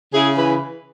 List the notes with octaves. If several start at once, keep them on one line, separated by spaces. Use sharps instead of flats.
C#3 E4 G#4
E3 G#4 B4